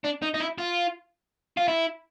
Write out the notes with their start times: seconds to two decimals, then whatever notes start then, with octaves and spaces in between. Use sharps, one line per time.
0.04 D4
0.22 D#4
0.34 D#4
0.40 E4
0.58 F4
1.57 F4
1.68 E4